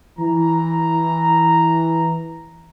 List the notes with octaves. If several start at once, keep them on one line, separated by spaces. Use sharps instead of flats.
E3 A#5